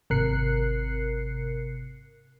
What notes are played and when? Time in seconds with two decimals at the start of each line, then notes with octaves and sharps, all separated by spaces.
0.10 G#1 C3 A#4 F#6 C7 C#7